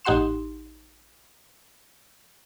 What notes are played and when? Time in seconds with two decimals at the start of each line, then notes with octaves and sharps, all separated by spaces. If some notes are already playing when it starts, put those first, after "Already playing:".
0.05 A1 D#4 G4 F#5 C6 E7